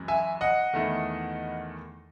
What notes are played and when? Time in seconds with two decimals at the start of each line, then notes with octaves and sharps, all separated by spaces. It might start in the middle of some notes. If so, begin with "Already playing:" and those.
Already playing: F#2 E3 G#3
0.08 E5 G#5
0.41 D#5 F#5
0.73 E2 D#3 A3 E4